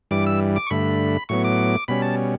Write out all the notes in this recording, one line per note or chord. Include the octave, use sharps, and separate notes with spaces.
G2 E3 G3 D6
E6
D6
C#6
G2 D3 A3 B5
A2 F#3 B3 C#6
D6
B2 G3 C#4 B5
A5